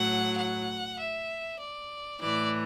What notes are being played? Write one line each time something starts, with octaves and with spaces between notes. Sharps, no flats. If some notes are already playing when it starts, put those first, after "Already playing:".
Already playing: A2 F#3 F#5
F#5
E5
D5
A2 E3 D5